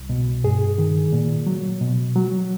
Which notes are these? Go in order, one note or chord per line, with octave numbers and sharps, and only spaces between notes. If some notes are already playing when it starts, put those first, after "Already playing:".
Already playing: C2
B2
G2 G#4
D#3
A#2
F#3
B2
F#3